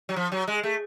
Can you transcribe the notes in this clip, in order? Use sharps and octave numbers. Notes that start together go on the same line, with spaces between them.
F#3
F3
F#3
G#3
A3